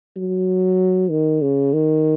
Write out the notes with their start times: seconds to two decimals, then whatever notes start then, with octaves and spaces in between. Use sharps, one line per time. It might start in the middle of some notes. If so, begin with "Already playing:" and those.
0.16 F#3
1.11 D#3
1.42 C#3
1.73 D#3